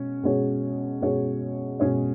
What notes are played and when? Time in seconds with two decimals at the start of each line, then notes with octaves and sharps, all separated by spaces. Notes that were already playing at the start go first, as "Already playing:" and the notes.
Already playing: B2 G#3 C#4
0.23 B2 G#3 C#4 G#4 C#5
1.02 B2 G#3 C#4 G#4 C#5
1.80 B2 G#3 C#4 G#4 C#5